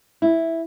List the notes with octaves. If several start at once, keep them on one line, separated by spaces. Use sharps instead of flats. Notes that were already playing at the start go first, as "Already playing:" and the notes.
E4